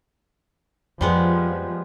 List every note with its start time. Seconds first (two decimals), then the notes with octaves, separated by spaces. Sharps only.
1.01 F2 F3 G3 G#3 B3